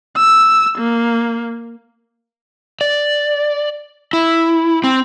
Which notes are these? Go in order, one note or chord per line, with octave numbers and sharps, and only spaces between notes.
E6
A#3
D5
E4
C4